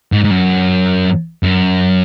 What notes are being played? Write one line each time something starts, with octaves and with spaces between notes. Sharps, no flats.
G#2
G#2
F#2
F#2